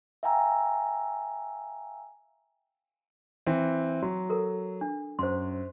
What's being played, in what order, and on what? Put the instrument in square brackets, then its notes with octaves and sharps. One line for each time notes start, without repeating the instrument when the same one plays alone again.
[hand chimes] E5 F5 G5 G#5 A#5 E6
[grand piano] E3 C4
[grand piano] F#3 [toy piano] F#4
[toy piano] A4 A#4
D4
[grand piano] F#2 [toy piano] C5 C6